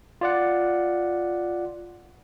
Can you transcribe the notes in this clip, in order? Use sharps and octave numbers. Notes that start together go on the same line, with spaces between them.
F4 D5 F#5